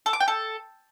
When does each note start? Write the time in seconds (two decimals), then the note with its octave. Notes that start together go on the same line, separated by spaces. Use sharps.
0.06 A4
0.13 D6
0.20 G5
0.28 A4